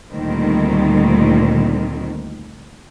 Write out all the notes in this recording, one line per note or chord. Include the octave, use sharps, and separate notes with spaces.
D2 A#2 D#3 G3 C4